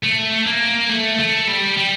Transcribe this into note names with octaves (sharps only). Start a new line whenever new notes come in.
A3
A#3
A3
A3
G3
G3